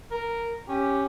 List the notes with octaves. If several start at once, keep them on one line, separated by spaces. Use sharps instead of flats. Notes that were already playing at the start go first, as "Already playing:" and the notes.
A#4
C#4 G4